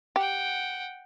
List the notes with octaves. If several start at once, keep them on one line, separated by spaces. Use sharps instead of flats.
G4 F#5 G5